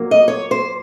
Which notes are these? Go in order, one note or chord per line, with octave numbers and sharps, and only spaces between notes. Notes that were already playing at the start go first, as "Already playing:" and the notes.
Already playing: A#2 F#3 A#3
D#5
C#5
C5